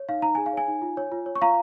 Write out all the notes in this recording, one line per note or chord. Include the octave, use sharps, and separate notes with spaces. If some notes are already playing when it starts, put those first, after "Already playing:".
Already playing: C#5
D#4 F5
D#4 A#5
G#4 G#5
F5
C#5 G#5
D#4
F4
C#5
F4
C#5
C#6
F4 F5 A#5